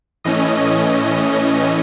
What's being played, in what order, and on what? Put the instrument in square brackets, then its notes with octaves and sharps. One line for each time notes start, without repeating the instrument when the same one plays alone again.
[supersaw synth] A2 E3 A3 C#4 D#5